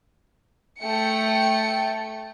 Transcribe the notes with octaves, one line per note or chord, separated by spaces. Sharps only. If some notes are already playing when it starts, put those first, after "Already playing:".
A3 G5 C#7